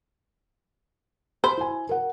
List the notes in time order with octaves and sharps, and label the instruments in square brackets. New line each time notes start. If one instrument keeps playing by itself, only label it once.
[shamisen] C5 [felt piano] B5
[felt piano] E4 G#5
A#4 F#5